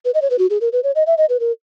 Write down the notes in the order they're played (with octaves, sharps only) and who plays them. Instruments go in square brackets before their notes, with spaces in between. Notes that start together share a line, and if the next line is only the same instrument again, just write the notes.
[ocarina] B4
D#5
C#5
B4
F#4
G#4
A#4
B4
C#5
D#5
E5
D#5
B4
A#4